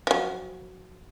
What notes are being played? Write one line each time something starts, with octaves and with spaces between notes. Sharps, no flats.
F3 F#3